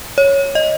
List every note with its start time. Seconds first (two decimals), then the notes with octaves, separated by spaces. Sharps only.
0.18 C#5
0.55 D#5